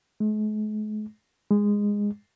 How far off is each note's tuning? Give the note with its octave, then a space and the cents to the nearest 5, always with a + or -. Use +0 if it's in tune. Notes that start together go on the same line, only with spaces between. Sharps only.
G#3 +45
G#3 -15